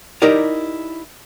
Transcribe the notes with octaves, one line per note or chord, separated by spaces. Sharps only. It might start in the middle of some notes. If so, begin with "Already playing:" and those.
D#4 E4 G4 A#4 D5